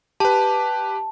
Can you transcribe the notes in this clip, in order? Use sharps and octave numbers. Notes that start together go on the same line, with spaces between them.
G4 B4 A5